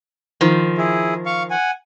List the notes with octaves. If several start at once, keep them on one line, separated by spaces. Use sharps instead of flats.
D#3 F3
E4 G#4
F5 C#6
F#5 G#5